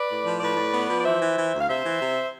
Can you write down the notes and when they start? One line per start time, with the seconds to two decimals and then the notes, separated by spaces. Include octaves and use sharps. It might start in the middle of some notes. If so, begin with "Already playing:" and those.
Already playing: B4 D5
0.09 A2
0.25 F3
0.40 A2 B4 D5
0.56 A2
0.73 B3
0.88 F3
0.99 D5
1.04 E3 C5 E5
1.21 E3
1.37 E3
1.53 D2
1.60 F5
1.69 C3 C5 E5
1.85 E3
2.01 C3